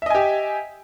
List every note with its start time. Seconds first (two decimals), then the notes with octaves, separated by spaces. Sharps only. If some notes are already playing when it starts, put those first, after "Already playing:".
0.02 E5
0.06 D#5
0.10 G#5
0.15 G4